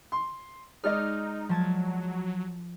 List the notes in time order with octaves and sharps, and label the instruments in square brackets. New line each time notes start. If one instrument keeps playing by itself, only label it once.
[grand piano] C6
[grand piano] G#3 D5 D#5 [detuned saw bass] D#4 [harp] F6
[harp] F3 A5 G#6 [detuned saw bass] F#3